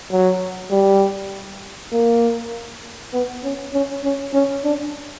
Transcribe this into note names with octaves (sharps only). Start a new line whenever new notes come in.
F#3
G3
A#3
B3
C#4
C#4
C#4
C#4
D4